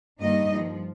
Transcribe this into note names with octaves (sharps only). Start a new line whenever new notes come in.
G2 D#3 G3 A#3 D#4 D#5
F3